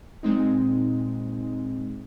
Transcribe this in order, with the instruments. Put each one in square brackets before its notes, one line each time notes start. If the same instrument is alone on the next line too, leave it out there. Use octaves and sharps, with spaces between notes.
[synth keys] A#2 G#3 C4 D#4